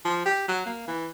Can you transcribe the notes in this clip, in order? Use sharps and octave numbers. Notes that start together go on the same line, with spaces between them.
F3
G4
F#3
A#3
E3